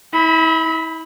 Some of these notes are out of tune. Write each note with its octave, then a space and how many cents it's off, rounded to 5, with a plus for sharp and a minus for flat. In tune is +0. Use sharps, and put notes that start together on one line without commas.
E4 -40 B5 +0